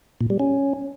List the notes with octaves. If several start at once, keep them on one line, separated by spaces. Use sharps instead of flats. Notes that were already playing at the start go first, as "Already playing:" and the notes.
A#2
G3
C#4